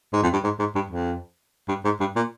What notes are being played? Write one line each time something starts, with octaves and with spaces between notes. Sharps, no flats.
G#2
F2
G2
G#2
G#2
G2
F2
G2
G#2
G2
A#2